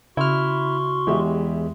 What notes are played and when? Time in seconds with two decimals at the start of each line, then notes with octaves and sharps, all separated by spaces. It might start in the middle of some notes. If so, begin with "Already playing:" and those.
0.17 C#3 E4 F#4 C6 C#6 F6
1.07 E2 G#3 G4 E5